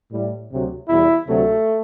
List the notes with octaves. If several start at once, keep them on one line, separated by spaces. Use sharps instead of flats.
A2 G3
D2 C3 F#3
E2 B2 G3 E4
D2 C3 F#3 A3